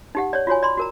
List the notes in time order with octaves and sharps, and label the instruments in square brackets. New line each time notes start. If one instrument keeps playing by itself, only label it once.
[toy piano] D#4 G4 F#5
C#5 D5
F4 F#4 C#5 G#5
D5 B5 C6
F#4 A#4 A#5